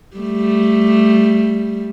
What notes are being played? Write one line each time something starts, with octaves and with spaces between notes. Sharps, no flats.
G3 A3